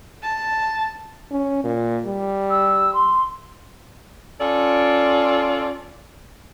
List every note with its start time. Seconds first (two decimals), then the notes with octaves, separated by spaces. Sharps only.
0.22 A5
1.32 C#4
1.64 A#2
2.06 G3
2.50 E6
2.94 C6
4.41 C#4 F4 A4 D5